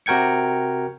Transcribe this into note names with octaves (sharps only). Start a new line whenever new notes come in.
C3 F#4 A#4 G5 G#6 C#7